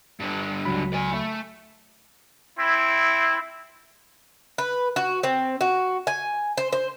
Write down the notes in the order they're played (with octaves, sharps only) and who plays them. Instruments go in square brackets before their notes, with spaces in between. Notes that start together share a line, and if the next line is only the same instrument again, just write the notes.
[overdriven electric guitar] G2 D3
[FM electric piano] C#2 F#3 B5
[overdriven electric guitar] D5 G#5
A3
[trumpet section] C4 E4
[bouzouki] B4
F#4
C4
F#4
G#5
C5
C5